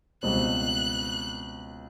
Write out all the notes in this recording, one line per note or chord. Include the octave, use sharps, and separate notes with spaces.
C#2 B2 G3 C4 F#6